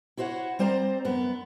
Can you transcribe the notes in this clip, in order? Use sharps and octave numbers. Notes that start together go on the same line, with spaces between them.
E4 F#4 C5 C#5 F#5
G3 C4 C5 D5 A#5
F#2 B3